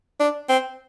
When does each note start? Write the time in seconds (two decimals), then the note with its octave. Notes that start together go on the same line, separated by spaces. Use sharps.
0.20 D4
0.49 C4